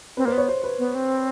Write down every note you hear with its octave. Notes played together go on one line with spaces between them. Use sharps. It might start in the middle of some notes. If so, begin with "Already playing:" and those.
C4 B4
A#3 C5
B3 C#5
C5
B4
B3
C4